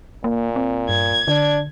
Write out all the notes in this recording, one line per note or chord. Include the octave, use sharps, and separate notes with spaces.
A#2 A#3
C4
G2 G#6
D3 D4